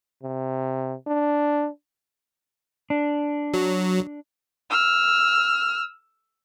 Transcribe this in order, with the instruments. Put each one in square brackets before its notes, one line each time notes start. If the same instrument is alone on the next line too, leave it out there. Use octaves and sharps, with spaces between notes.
[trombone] C3
D4
[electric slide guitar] D4
[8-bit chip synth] F#3
[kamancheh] E6 F6